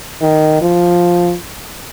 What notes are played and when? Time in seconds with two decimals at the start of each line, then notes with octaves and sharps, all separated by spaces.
0.21 D#3
0.61 F3